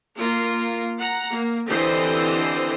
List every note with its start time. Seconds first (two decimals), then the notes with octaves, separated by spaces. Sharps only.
0.17 A#3 F4 A#4
0.98 F#5 A#5
1.31 A#3
1.67 D3 E3 C4 G4 C5 D#5